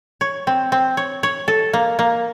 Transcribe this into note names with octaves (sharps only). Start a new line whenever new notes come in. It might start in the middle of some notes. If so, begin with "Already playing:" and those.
C#5
C4
C4
C#5
C#5
A4
A#3
A#3